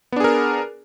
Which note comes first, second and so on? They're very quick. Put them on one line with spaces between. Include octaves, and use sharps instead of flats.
B3 D4 G#4 A#4